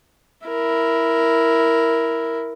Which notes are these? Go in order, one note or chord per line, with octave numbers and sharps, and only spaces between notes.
E4 A#4